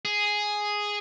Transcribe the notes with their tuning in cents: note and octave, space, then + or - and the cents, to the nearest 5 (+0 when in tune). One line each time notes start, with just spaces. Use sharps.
G#4 +0